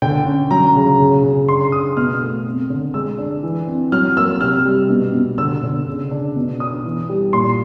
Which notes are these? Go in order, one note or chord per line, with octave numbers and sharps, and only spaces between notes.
D3 G5
C#4
F#3 A#5
C#3
C#3
C#3
D4 C6
D4 D#6
B2 F6
A3
C4
D3
G#3 E6
D4
E3
C4
F#3 F6
A#3 E6
C3 F6
G3
B2
B2
D3 E6
D3
C#3
D4
B2
D4 D#6
E3
G3
A#2 C6